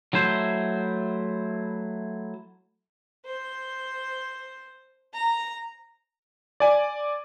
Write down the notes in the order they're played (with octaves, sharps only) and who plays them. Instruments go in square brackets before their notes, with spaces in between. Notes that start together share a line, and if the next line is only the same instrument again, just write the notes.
[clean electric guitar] F#3 A3 E4 C5
[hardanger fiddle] C5
A#5
[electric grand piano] D5 G#5